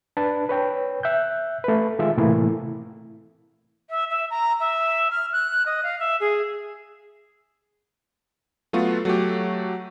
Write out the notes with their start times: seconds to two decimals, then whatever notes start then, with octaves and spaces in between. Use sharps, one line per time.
0.17 D4 B4 A5
0.49 B4 C#5 G5
1.03 E5 F#6 G6
1.64 A3 B4
1.99 D#3 G#3 F4 E5
2.18 A2 C3 E3 A3 A#3 E4
3.89 E5
4.09 E5
4.30 A#5
4.59 E5
5.10 F6
5.32 F#6
5.65 D#5
5.83 F5
5.99 E5
6.20 G#4
8.73 F#3 A3 B3 F4 F#4
9.05 F#3 A3 F#4 G4